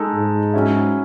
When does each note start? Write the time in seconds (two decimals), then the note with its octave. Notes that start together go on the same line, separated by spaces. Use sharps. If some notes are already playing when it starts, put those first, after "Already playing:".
Already playing: G#3 D#4 A4
0.13 G#2
0.53 F#3 C#4 E4